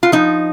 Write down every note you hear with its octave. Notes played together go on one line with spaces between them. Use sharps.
F4
F3 D#4